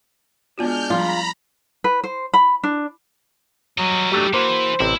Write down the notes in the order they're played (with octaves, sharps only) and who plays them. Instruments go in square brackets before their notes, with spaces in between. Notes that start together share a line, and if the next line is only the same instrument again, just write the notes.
[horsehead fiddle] G#3 D4 [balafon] B3 F4 F#4 [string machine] F6 G6
[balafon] F3 G3 [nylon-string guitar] F4 [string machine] A#5 B5
[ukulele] B4
C5
B5
D4
[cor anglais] F#3 [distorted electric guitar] G3 D#5
[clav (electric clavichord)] F#3 A3 D4 [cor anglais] G4
[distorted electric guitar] E3 [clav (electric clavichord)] A#3 F#4 [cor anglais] C5
[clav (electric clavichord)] A1 C3 C4 [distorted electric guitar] E4